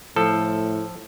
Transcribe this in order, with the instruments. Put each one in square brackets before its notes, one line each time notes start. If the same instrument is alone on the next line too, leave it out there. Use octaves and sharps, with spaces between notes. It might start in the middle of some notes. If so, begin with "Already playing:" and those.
[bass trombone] A2 [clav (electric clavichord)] F3 A4